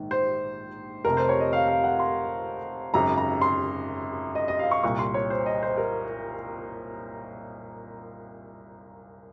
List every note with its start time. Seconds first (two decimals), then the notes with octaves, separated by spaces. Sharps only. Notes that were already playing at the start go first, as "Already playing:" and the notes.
Already playing: A#1 G#2 D#3
0.11 C5
1.05 F1 F2 C3 A#4
1.17 C5
1.29 C#5
1.40 D#5
1.53 F5
1.68 F5
1.84 F#5
2.00 C6
2.94 G#1 F#2 C#3 A#5
3.18 A#5
3.42 C6
4.35 D#5
4.48 D#5
4.59 F5
4.71 C#6
4.83 C2 A#2 C#6
4.99 C6
5.14 C#5
5.30 C5
5.46 D#5
5.63 C5
5.78 A#4